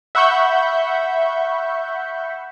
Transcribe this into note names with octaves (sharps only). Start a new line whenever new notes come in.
E5 F#5 B5 C#6 G6